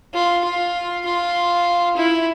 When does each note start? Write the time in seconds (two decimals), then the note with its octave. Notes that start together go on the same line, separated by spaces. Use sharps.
0.14 F4
0.44 F4
1.05 F4
1.97 E4